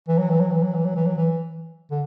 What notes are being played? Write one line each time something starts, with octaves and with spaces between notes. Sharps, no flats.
E3
F#3
E3
F#3
E3
F#3
E3
F#3
E3
F#3
E3
D3